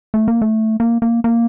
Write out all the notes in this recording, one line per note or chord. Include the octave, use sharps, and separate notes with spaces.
A3
A#3
A3
A#3
A#3
A#3